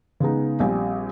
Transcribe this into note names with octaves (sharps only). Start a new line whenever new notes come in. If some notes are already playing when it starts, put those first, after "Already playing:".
C#3 G#3 B3 D#4
A#1 G3 C4 G#5